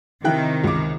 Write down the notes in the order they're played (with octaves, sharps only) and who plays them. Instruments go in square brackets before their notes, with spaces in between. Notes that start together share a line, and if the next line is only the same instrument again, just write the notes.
[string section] C3 D#3 [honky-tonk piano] E4 G5 F#6
[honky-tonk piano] C#2 D6